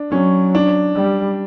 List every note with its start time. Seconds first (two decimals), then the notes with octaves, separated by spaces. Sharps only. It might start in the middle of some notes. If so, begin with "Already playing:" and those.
Already playing: D4
0.12 F#3 C#4
0.55 D4
0.96 G3